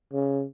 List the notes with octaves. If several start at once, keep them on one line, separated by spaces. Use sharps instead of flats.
C#3